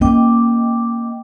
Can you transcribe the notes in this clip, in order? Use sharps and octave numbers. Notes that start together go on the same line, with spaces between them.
A#3 C#4 D#5 G5 D6